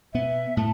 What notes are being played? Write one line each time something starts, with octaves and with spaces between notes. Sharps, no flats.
B2 B3 E5
A2 A3 A5